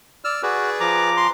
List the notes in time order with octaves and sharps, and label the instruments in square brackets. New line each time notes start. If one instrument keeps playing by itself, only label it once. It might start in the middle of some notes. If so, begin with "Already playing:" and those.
[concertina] D5 E6 F6
[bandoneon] F#4 [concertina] G#4 B4 D5
[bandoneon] F3 A#5 D6
[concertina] C6